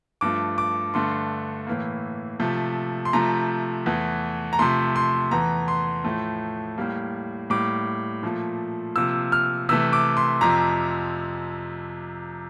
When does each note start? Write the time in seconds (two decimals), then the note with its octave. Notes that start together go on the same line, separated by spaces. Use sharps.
0.21 G2 F3 A3 D6
0.58 D6
0.94 G2 D3 A3 C6
1.67 A2 E3 A#3
2.40 C3 F3 A3
3.05 C6
3.13 C3 F3 A3 A#5
3.86 E2 E3 A3
4.53 A#5
4.59 C3 F3 A3 C6
4.96 C6
5.31 E2 E3 A3 A#5
5.68 C6
6.04 A2 F3 A3
6.78 A2 G3 A#3
7.50 A2 G3 A#3 D6
8.23 A#2 F3 A3
8.96 C3 F3 A#3 E6
9.32 F6
9.69 C3 E3 A3 E6
9.93 D6
10.17 C6
10.41 F2 C3 F3 A#5